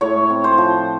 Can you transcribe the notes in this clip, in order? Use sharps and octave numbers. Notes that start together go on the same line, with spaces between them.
A2 C#5
C4
C5
F3